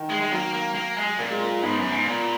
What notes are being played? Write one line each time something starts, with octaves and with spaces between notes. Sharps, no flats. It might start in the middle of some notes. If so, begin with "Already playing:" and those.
Already playing: D#3
G#3
G#3
F#3 A#3
A#3
A#3
G#3
A#2 A#3
G#3
A#3
G#2 B3
F#2
G#2
A#2